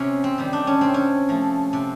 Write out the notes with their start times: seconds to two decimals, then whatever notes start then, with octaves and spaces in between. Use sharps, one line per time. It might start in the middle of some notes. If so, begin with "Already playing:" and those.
Already playing: C3 C#4
0.24 C4
0.38 D#3 G3 C4
0.53 D4
0.67 C#4
0.81 C3 C4
0.94 C#4
1.29 F3 A3
1.73 C3